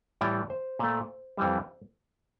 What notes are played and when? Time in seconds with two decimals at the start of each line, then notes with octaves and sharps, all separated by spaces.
0.21 A2 E3 G3 D5
0.50 C5
0.79 A#2 A3
1.37 F2 E3 G3